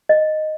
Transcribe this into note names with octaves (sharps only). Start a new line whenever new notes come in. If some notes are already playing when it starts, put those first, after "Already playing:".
D#5